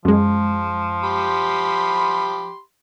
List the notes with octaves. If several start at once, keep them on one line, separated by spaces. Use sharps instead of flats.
F#2 F3 G#3
G4 B5 C6